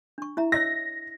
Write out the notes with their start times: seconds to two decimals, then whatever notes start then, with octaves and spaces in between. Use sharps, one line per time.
0.18 D4 C#6
0.37 E4 E5 A#5
0.52 C#5 D#5 E6 A#6